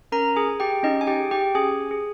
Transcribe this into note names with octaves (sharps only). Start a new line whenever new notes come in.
C#4 A#4 A#5
G#4 G#5
G#4
G4 G5
C#4 D#4 D#5
G#5
G4 G5
G#4
G4 G5
C#4 G#4 G#5
G#4